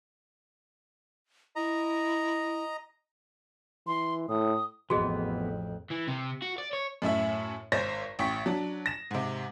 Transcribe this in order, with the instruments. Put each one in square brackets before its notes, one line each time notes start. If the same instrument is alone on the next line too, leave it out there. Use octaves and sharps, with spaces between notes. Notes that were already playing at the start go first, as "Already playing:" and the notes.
[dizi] E4 [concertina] D#5 A#5
[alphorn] E3 [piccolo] C6
[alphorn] A2 [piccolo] D#6
[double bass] A1 F2 [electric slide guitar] E3 B3 [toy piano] F#4 G#4 D#5
[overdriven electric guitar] E3
C3
F#4
D5
C#5
[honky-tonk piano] F#2 A2 E4 E5
G#1 C5 C#5 A#6
A1 G5 C#6 B6
F#3 D4
A#6 E7
G#2 C3